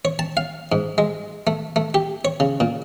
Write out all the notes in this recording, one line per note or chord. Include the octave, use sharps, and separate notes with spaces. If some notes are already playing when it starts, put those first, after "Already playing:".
C#5
A5
F5
G#2
G#3
A3
A3
G4
C#5
C#3
A#2